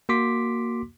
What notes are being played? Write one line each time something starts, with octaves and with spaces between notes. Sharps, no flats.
A#3 F#4 C6 D6 B6